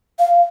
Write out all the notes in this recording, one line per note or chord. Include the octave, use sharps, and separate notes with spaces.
F5